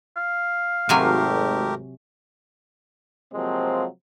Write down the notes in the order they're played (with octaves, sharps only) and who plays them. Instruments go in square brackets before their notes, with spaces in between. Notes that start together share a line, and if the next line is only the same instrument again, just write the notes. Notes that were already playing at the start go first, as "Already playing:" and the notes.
[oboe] F5
[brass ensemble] G#1 [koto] C3 F#3 G#5 [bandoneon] A3 G4 A#4
[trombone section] C3 F3 F#3 G#3 A#3 C4